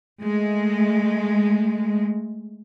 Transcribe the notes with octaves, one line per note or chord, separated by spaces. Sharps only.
G#3 A3